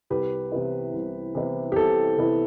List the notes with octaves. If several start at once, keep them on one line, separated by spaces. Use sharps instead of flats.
C2 G4 B4
C3 E3 B3 E4
C2
C3 E3 B3 E4
G4
C2 A4
C3 E3 B3 E4